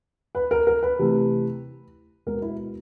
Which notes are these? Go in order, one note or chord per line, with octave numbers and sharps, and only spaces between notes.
B4
A#4
A#4
B4
C3 E3 A3
B2 G#3 B3 A#4
E4